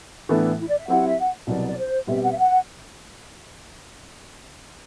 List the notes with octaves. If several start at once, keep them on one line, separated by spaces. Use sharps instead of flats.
A2 E3 B3 D4 E4 A4
E4
D5
E5
F#3 C4 E4 G4 F#5
E5
F#5
C2 B2 F#3 B3 D5
D5
C5
B2 G3 C4 G4 B4 E5
F#5
E5
F#5